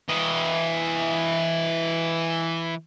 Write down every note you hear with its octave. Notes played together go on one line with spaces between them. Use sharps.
E3 D#5